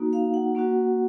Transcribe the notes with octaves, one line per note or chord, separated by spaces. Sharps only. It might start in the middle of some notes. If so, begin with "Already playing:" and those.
Already playing: A#3 D#4 F#4
F5
F#5
A#3 C#4 F#4